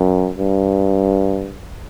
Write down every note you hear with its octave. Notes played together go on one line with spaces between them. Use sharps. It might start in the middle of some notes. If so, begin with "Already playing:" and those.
Already playing: F#2
G2